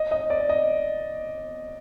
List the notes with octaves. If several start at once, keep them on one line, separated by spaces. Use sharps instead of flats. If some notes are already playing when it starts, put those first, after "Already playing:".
Already playing: D#5
D#5
D5
D#5